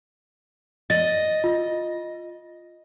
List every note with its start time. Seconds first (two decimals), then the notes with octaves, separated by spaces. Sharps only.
0.90 D#5 A6
1.44 F4